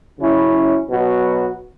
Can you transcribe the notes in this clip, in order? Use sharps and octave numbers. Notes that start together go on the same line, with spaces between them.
C#3 F#3 C#4 E4
B2 F#3 B3 F#4